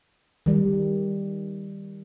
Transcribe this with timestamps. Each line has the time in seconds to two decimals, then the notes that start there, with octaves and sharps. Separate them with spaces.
0.46 D#3 G3